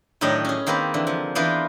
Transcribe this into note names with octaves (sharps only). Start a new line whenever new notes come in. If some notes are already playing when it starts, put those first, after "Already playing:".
A2 D#3 F#3 D4 G4 D#5
C#4 G#4
D#3 A#3 C4 B4
D3 E3
F3
E3 B3 D4 F4 A#4 C5